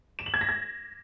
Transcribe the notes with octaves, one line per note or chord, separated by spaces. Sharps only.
E7
F#7
G#6
A#6
G#6